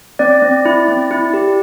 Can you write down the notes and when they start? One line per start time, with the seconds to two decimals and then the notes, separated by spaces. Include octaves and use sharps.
0.19 C4 D5
0.42 C4
0.65 E4
0.88 C4
1.11 E4
1.34 G4